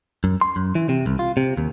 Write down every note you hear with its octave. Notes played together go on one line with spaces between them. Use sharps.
F#2
C6
F#2
E3
C3
C2
F4
C3
D#2